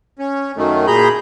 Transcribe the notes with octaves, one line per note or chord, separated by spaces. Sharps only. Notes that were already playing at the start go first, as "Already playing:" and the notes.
C#4
F#2 D#3 A3
A#2 G#4 A#5 B5 G6